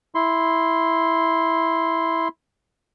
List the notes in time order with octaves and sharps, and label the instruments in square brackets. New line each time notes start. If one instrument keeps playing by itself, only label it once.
[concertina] E4 C6